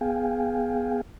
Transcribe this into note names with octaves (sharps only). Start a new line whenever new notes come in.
B3 G#4 F5 G5 G#5